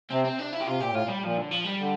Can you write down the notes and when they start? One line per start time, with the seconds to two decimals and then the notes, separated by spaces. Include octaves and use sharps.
0.10 C3 C4
0.25 C4
0.39 D4
0.53 E4
0.61 G4
0.67 C3 F4
0.79 A#2 G4
0.91 A2 F4
1.03 A#2
1.09 G3
1.24 A#2 F3
1.38 D3
1.51 F3
1.65 G3
1.80 D3